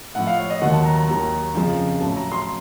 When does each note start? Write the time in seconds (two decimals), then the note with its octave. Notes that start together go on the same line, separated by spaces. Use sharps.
0.15 A2 F3 F#5
0.27 F5
0.39 C#5
0.50 D#5
0.61 D#2 D#3 F#3 F#5
0.73 A5
0.85 A#5
0.96 A#5
1.08 D#2 D#3 F#3 A#5
1.55 F2 C#3 F3
2.01 A2 F#3 A5
2.16 A#5
2.32 C6